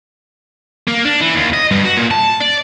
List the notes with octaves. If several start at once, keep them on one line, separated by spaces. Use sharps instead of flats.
A#3
D4
E3
D#2
D#5
G2
F#4
A#2
A5
D5